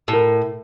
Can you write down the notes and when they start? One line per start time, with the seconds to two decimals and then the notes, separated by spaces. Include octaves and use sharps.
0.08 A2
0.13 A#4